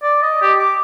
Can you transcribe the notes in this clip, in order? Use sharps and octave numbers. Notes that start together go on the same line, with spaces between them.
D5
D#5
G4
D6